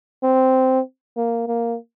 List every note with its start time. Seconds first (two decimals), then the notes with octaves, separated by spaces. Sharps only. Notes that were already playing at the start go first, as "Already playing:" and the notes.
0.23 C4
1.17 A#3
1.48 A#3